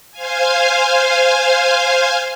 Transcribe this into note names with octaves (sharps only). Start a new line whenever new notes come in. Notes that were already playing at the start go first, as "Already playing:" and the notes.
C5 F5 G#5